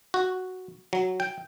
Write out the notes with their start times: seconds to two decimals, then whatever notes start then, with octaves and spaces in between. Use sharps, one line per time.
0.14 F#4
0.93 F#3
1.20 G5